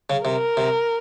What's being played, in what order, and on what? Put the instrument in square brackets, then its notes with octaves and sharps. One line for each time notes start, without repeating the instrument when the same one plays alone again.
[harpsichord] C#3
[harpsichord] C3 [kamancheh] A#4
[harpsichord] C3